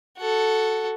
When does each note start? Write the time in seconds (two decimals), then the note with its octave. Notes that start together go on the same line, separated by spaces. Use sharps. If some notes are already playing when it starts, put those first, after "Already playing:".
0.19 F#4 A4